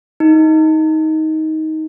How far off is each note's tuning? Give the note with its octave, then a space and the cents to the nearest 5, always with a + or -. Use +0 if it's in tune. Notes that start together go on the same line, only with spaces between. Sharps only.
D#4 +15